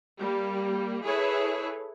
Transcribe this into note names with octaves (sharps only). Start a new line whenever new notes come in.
G3 A#3
E4 G#4 A4 B4 C#5